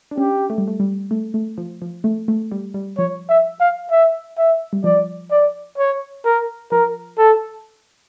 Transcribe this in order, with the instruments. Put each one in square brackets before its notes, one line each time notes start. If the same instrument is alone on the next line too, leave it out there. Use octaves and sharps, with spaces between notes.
[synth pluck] D4
[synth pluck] C#4 [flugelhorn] G4
[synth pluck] A3
G3
A3
G3
A3
A3
F3
F3
A3
A3
G3
G3
[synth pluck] F3 [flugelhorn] C#5
[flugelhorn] E5
F5
E5
E5
[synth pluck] G3
[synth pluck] F3 [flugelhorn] D5
[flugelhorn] D5
C#5
A#4
[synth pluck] F3 [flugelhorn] A#4
[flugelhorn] A4